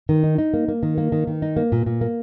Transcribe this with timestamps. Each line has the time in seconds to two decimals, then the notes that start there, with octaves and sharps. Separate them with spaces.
0.09 D#3
0.24 D#4
0.38 D#4
0.54 A#3
0.68 A#3
0.83 D#3
0.98 A#3
1.12 D#3
1.27 D#3
1.42 D#4
1.57 A#3
1.72 A#2
1.86 A#2
2.01 A#3